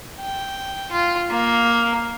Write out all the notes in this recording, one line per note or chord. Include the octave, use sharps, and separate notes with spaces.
G5
F4
A#3